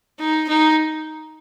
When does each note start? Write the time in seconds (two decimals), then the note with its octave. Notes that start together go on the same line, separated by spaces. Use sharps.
0.20 D#4
0.48 D#4